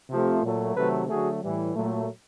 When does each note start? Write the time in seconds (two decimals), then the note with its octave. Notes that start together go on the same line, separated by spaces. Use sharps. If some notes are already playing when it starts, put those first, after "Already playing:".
0.09 C3 F3 A3
0.42 A#2 F#3 A3
0.75 C3 D#3 F#3 A3 A4 B4
1.08 D3 F#3 A3 F#4 G#4
1.41 A2 E3 G3
1.74 A#2 F#3 A3